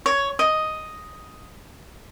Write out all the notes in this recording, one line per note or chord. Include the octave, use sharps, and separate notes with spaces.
C#5
D#5